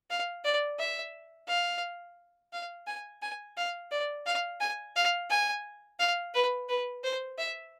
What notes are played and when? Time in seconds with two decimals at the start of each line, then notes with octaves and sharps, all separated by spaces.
0.10 F5
0.45 D5
0.79 E5
1.48 F5
2.53 F5
2.87 G#5
3.22 G#5
3.57 F5
3.91 D5
4.26 F5
4.60 G#5
4.96 F5
5.30 G#5
5.99 F5
6.34 B4
6.69 B4
7.04 C5
7.38 E5